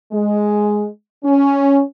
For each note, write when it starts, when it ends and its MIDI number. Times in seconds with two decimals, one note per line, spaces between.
0.13 0.88 56
1.25 1.83 61